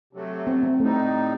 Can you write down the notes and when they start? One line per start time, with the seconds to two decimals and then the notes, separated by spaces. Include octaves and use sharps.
0.13 C3 F#3 A3
0.47 C4
0.63 C4
0.80 A2 G3 A3 D#4